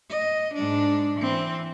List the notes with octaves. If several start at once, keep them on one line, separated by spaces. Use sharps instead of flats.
D#5
G#2 D4
E3 C4